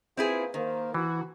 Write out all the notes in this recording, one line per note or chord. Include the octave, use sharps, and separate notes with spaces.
A#3 C4 E4 F4 G#4 B4
D#3 A#3 C5
E3 E4 F#4